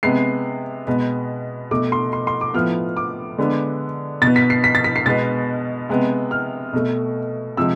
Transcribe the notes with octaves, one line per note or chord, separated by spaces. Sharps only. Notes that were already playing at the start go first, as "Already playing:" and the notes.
C3 G#3 B3 C7
B2 G#3 B3
B2 A3 D6
C6
C6
C6
D6
A2 F3 B3 F6
D6
D3 G#3 B3
B2 A6
B3
B6
C7
B6
A6
B6
C7
B2 G#3 B3 A6
C3 G#3 B3
F6
B2 A3
C3 F3 G#3 E6